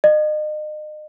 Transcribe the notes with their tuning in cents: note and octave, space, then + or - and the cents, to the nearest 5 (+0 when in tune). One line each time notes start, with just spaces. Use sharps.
D#5 -35